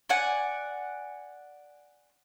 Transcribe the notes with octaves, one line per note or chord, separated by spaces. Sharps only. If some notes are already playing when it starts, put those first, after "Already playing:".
D5 F#5 G#5